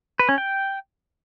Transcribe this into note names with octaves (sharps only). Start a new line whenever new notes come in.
B4
C#4
G5